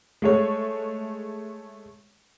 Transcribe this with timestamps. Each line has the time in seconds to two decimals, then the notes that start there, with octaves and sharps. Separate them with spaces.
0.22 G#3 A3 C#5